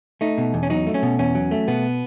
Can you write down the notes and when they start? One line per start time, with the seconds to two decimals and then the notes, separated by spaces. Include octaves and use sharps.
0.21 A3 D#4
0.38 B2
0.54 E2
0.63 C#4
0.70 F#3 D#4
0.87 A3
0.94 C#4
1.02 B2
1.19 E2 C#4
1.35 F#3
1.51 A3
1.68 B2 B3